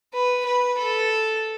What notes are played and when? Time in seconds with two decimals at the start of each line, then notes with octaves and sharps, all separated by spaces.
0.14 B4
0.45 B4
0.78 A4